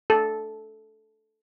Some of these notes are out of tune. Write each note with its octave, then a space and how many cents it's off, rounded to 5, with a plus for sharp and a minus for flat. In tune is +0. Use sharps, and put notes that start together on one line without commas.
A4 -10